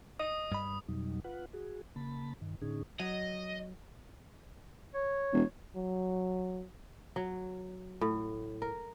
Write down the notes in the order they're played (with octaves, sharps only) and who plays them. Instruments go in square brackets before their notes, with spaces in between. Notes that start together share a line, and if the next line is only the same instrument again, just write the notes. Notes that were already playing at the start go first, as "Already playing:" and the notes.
[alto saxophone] D#5 [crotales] D#6
[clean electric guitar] G2 B5
[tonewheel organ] F2 B2 F#3 G3 D#4
F4 B4 F#5
F#4 G#4
C#3 A#3 A5 B5
G2 D#3
A2 D3 C#4 D#4 G#4
[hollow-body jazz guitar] F#3 [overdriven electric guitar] D#5
[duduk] C#5
[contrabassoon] E1
[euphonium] F#3
[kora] F#3
A2
A#4